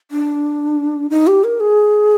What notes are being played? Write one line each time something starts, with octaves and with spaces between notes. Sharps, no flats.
D4
D#4
G4
A#4
G#4